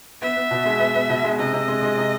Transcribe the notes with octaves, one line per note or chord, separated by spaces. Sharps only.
B3 E5
B3
B2
G#3
B3
B3
B2
G#3
C3 D#5
C3
G#3
G#3
C3